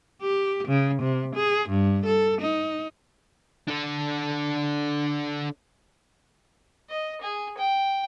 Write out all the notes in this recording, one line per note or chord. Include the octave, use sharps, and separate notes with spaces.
G4
C#3
C3
G#4
G2
A4
D#4
D4 A4
D#5
G#4
G5